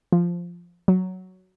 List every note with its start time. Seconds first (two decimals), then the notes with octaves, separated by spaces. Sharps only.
0.12 F3
0.88 F#3